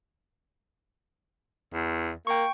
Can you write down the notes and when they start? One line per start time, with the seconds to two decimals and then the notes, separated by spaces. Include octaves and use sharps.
1.73 E2
2.27 A#3 G5 C#6